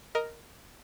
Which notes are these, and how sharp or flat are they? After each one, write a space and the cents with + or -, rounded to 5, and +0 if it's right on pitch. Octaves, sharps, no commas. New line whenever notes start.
A#4 +0 D#5 +5